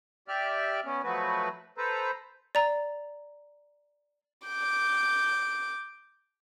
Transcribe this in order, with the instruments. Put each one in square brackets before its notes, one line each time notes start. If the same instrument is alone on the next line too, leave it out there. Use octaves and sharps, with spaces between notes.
[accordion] G4 D5 E5 F6
B3 C#4
F3 F#3 A3 F#4 B4
A4 B4 C5 A#5
[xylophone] D5 A#5
[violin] D6 G6